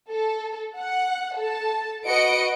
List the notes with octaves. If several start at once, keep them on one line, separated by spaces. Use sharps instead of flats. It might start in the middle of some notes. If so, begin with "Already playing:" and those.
A4
F#5
A4 A5
F#4 B4 D#5 C#7 D7